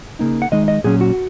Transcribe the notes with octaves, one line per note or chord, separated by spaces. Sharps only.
C#3 A#3 D#4
F#5
D#3 G#3 D#4 D#5
D#5
A#2 F#3 C#4 G#4
F#4